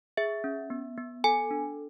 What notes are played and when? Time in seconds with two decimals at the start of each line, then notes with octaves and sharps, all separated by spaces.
0.17 G#4 E5
0.44 C#4
0.70 B3
0.97 B3
1.24 A4 G#5
1.51 D4